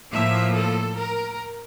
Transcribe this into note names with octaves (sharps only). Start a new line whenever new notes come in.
A2 F3 A#3 E5
A4
A#4